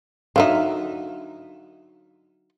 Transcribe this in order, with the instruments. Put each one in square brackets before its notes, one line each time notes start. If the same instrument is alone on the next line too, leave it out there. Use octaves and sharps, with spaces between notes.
[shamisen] D3 F#3 D#4 [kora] E5 F5